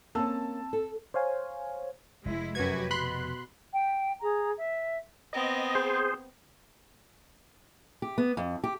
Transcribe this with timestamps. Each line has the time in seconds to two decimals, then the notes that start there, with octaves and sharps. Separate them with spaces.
0.15 A#3 C4 C#4 A5 E6
0.73 A4
1.14 C5 C#5 F5 G#5
2.25 F1 G#3 E4
2.55 F#2 F#4 G4 B4 G#6
2.91 B2 B5 C6 F#6
3.74 G5
4.22 G#4 A#5
4.56 E5
5.33 B3 C4 D#5
5.75 G#4 C5
8.02 G4
8.18 B3
8.37 F2
8.64 G4